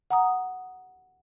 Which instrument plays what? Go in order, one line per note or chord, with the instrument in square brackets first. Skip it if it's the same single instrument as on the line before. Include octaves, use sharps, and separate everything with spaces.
[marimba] F#5 A#5 D#6